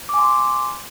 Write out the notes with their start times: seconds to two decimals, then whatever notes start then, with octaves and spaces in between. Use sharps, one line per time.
0.09 D6
0.14 G#5
0.18 C6